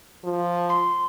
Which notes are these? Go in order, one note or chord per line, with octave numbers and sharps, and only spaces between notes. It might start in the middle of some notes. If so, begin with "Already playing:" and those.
F3
C6